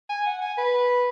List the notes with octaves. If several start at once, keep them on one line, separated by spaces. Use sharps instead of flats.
G#5
F#5
G#5
B4